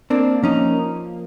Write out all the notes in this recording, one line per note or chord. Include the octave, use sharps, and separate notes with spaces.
A#3 C4 D4
F3 C#4 D#4